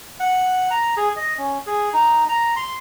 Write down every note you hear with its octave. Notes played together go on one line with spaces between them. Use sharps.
F#5
A#5
G#4
D#5
C#4
G#4
D#4
A#5
C6